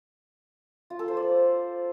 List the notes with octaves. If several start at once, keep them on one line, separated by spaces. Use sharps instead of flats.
F4
A4
C5
D5